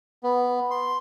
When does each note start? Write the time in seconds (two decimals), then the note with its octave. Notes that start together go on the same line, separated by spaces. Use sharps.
0.23 B3
0.71 C6